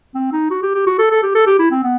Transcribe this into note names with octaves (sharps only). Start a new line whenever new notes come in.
C4
D#4
F#4
G4
G4
F#4
A4
A4
G4
A4
G4
E4
C4
B3